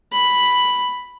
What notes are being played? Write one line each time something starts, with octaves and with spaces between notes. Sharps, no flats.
B5